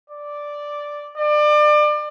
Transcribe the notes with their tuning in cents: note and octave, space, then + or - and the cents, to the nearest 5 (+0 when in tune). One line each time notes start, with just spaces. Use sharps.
D5 +0
D5 +30